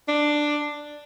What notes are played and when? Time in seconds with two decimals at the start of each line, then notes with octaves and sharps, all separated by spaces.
0.08 D4